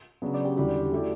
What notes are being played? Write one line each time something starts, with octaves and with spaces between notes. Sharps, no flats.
C#3 F#3 B3 D4
D5
G4
E2 D3 G3 D4 F#4 G4
A3 E4 G4 D5